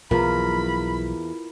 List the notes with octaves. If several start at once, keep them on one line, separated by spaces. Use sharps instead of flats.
B1 E2 F3 F#3 F4 A#4 B5